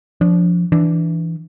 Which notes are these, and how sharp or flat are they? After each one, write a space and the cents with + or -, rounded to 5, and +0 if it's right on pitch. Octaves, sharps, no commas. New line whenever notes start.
F3 +0 D4 -25
E3 +0 D4 +0